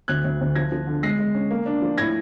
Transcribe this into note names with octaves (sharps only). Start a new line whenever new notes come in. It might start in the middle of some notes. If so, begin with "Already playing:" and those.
D2 F#6 G#6
D2
D2
F3 G#6 A#6
F3
D3
G#3 A#6 C7
G#3
C#4
A#3
D4
F3
A2 G#6 A#6